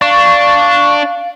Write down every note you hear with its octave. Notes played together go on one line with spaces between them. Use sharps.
D4 F5 C#6